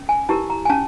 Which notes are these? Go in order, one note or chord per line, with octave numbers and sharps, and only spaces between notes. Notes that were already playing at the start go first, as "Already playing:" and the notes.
Already playing: C#4
G#5
E4 G4 A#4 A5
A#5
G#5
C#4 A5